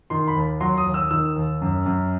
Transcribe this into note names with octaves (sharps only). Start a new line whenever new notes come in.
D#3 C6
B5
D#2
F#3 C6
D#6
D#2
E6
D#3 E6
D#2
F#2
F#2